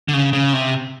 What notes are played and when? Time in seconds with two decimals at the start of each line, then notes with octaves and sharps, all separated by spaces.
0.08 D3
0.14 C#3
0.33 C#3
0.53 C3